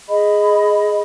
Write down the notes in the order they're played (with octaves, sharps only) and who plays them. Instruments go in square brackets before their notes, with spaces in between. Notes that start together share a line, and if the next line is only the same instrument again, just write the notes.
[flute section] G#4 D#5 B5